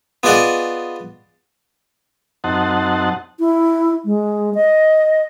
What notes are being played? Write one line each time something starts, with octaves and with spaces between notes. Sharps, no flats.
B3 F4 G#4 D5 D#5 F#5
F#2 C4 D#4 F#5 A5
E4
G#3
D#5